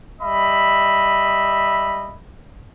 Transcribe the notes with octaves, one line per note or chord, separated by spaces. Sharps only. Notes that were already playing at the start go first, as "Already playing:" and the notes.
G3 D#5 E5 B5